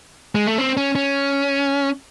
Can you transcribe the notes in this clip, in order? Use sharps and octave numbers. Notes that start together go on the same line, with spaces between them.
G#3
A3
C4
C#4
C#4